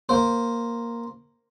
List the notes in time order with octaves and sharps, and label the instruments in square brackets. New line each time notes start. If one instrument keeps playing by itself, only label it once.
[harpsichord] A#3 C5